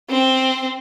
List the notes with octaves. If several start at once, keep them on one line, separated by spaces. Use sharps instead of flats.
C4